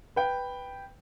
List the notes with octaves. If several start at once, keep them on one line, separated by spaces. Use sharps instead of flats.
B4 G5